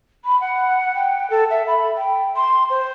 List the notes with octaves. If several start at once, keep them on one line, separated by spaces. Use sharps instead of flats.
B5
F#5
G5
A4
E5
B5
G5
C6
C5